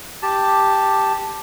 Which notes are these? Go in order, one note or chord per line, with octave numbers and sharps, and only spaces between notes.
G4 A5